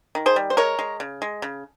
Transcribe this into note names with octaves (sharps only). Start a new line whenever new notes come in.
D#3
G#4 C5
G3
C5
G#3 A#4 C#5
G#3
C#3
G#3
C#3